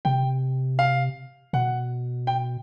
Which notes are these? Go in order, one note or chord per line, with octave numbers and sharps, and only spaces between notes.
C3 G5
F5
B2 F#5
G5